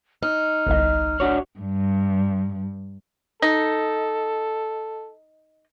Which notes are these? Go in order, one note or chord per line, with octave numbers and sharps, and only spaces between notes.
D#4 F6
G1 C2 D#5
D4 F#4 C#5
G2
D#4 A4